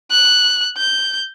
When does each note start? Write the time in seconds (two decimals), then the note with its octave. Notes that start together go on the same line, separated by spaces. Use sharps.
0.12 F#6
0.78 G6